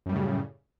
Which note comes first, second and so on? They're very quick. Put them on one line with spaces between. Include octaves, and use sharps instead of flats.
F#2 G3 A2 C#3